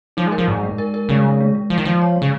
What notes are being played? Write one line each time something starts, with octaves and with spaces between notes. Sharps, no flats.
F3 D#4
G#3
A#4
F3
G#2 G#3
G#3
A#4
A#4
C#3 G#3
G#3
G#3
G#3
F3 G#3
D#3
F3 G#3
C#5
G#3
C#3